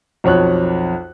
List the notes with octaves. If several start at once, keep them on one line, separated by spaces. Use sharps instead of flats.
B1 F2 C#5 F#6